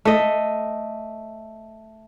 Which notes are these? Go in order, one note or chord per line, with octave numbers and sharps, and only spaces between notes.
A3 D#5